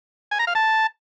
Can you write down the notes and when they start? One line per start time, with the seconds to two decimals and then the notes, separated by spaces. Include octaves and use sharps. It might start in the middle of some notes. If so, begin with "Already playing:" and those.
0.31 G#5
0.39 A#5
0.47 F5
0.55 A5